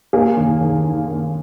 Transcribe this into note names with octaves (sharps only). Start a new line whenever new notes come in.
A#3 G#4
D#2
D#2
D#3
A#3